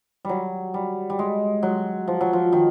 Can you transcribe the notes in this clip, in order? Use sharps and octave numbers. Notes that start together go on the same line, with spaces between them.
F#3 G3
G3
G3
G#3
F#3
F3
F#3
F3
D#3